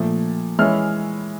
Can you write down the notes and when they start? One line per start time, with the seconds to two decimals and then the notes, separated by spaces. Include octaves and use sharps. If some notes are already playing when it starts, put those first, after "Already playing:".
Already playing: A#2 F3 A3
0.59 E3 G#3 C#4 E4 F6